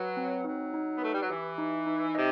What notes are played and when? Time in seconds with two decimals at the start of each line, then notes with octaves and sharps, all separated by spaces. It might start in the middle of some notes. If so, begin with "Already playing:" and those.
Already playing: F#3 B4
0.17 C4
0.44 F#3 D#4
0.74 D#4
0.95 B3
1.02 A3 B4
1.13 G3
1.21 F#3
1.29 E3 G4
1.58 D#4
1.87 D#4
2.15 C3 D#5